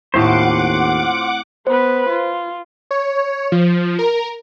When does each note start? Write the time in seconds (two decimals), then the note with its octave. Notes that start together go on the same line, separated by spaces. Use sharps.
0.14 D#2 A2 A3 C4 F4 C5 F#5 D6
1.67 B3 B4 C5
2.10 F4
2.91 C#5
3.52 F3
3.99 A#4